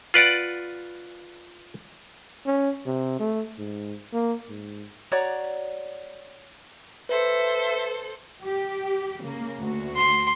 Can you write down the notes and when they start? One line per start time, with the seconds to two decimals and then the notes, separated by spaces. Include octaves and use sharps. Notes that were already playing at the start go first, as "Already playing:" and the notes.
0.14 F4 B4 D5 F#5
2.46 C#4
2.86 C3
3.19 A3
3.59 G#2
4.13 A#3
4.49 G#2
5.11 F#4 C#5 D5 A#5
7.09 A4 B4 C5 E5
8.44 G4
9.23 C#3 A#3
9.58 D2 F#4
9.97 C6